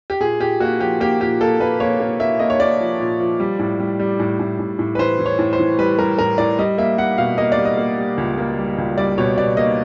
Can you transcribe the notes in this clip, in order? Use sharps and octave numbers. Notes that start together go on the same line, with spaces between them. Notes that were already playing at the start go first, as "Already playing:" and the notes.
G4
A#2 G#4
A#2 G4
A#3 F#4
F3 G4
A#3 G4
A#2 G4
A#3 A4
A#3 B4
A#3 C#5
A#3
A#3 E5
A#3 D#5
C#5
A#3 D5
F3
A#2
F3
G3
A2
G3
G3
A2
A2
A2
A2
B4
E3 C5
E3
C#5
A2
C5
E3
G3 B4
G3 A#4
A2 A#4
A2 D5
G3 D#5
A#3 E5
G3 F#5
B2 F5
A#3 D#5
D5
G3
D#5
A#3
G3
C#2
A#3
G3
C#2
G3 D5
B2 C#5
B2 D5
A#3 D#5